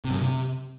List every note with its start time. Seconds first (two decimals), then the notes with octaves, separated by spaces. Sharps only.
0.05 C3
0.10 F#2
0.16 B2
0.22 C3